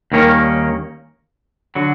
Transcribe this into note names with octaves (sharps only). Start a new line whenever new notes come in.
D#2 D#3 G3 A#3 C#4
D3 F#3